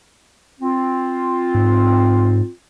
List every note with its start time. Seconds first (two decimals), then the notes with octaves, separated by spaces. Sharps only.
0.60 C4 F4
1.55 G#2